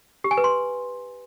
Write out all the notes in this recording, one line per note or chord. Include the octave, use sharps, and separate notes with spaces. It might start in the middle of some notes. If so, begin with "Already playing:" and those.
G4
G#5
B4
C6